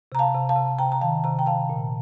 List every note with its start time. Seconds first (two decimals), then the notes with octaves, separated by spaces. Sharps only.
0.12 C3 A#5
0.19 F5 A5
0.35 C3
0.49 F5 A5
0.56 C3
0.79 C3 G5 A#5
0.92 A#5
1.01 D#3 F5 A5
1.24 C3 A#5
1.39 G5 A#5
1.46 C3 F5 A5
1.69 A#2